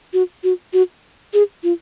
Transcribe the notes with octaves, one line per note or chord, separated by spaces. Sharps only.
F#4
F#4
F#4
G#4
F4